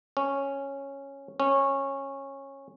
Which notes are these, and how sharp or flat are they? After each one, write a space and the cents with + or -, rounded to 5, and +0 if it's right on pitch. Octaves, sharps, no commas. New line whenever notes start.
C#4 -5
C#4 -15